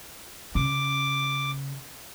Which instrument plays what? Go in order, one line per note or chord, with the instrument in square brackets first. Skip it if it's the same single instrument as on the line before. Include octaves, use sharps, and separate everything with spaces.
[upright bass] C#3 [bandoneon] D6